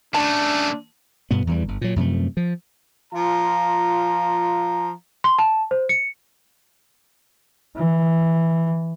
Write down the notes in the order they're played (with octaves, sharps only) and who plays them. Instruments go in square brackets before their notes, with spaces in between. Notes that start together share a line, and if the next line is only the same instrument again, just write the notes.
[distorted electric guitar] C#3 A3 [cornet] D4 [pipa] A5
[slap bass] G2 B2 B3
E2 E3 G3
G1
A#2 F#3
F#2 C3 F3 A3
F3
[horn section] F3 F4 A#5
[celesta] C6
A5
C5
C#7
[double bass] E3